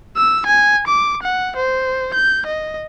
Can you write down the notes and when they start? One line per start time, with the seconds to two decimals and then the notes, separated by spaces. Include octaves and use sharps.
0.17 E6
0.46 G#5
0.88 D6
1.23 F#5
1.56 C5
2.14 G6
2.47 D#5